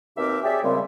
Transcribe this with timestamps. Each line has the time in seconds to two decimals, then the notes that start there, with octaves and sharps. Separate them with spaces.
0.17 D#2 B2 C4 A#4 E5 D6
0.44 G4 G#4 C#5 D5 E5
0.63 F#2 A#2 C#3 G3 G#3 C4